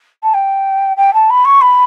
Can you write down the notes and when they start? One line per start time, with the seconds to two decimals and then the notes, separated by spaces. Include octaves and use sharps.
0.23 A5
0.34 G5
0.97 G5
1.14 A5
1.30 B5
1.45 C#6
1.61 B5